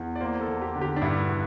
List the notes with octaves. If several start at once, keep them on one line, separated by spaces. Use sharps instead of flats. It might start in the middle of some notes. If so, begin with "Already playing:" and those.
Already playing: E2
D5
A#3 C5
A4
E2
G4
D3
G4
D4
G2 E4
D3